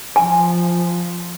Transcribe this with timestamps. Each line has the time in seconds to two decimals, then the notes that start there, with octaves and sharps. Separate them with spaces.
0.16 F3 G#5